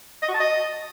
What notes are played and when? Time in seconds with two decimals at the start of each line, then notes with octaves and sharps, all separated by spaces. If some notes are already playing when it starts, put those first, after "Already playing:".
0.22 D#5
0.28 F#4
0.34 A5
0.40 D#5